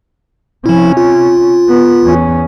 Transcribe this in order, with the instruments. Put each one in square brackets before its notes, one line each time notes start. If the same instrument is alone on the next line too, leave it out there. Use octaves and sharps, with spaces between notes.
[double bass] C3 C#4 [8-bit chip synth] F3 E4
[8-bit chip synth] F4
[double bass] B3
E2 C#4